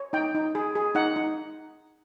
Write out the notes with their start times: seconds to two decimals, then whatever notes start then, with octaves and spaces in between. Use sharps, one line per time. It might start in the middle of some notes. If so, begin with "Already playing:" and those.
Already playing: C#5
0.13 D#4 G5
0.35 D#4
0.55 G#4
0.75 G#4
0.95 D#4 F#5
1.16 D#4